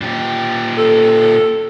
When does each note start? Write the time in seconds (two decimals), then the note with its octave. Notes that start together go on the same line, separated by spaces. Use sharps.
0.01 A#2 G4
0.78 A4